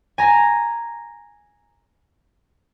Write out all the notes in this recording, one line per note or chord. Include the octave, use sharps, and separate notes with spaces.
G#5 A#5